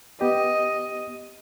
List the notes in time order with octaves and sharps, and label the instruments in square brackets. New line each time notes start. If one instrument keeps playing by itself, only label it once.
[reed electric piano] B3 G4 [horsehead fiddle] D#5